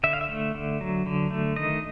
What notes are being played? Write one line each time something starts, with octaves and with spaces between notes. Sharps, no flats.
D3 E5
F5
E5
A3
D3
F#3
D3
A3
D#3 D#5